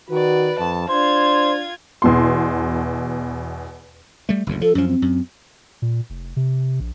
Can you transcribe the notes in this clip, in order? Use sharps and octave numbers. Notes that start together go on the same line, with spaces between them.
D#3 F#4 B4 D5
F2 A5
D4 F4 C5 G#6
E2 B2 C6
G3 A3
F#1 D2 A2
F3 A4
F#2 F3 C#4
C4
F#2
A#2
F1
C3
A#1